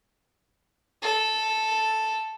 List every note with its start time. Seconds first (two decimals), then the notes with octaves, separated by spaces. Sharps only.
1.02 A4